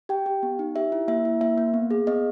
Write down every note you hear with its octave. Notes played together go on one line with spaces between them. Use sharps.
G4 G5
G4
B3
D#4
G4 E5
E4
A#3 E5
E4
A#3 E5
A#3
B3
G#4
B3 D#5